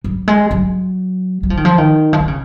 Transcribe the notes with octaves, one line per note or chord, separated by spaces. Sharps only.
F#3
G#3
F#3
F#3
F3
D#3
F3
D#3
F3
D#3
C#3